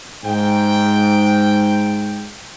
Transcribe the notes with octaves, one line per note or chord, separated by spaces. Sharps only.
G#2 G5